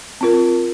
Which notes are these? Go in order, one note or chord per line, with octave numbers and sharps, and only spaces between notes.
C4 F4 A#4